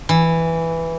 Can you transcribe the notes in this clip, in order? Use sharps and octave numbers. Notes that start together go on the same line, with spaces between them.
E3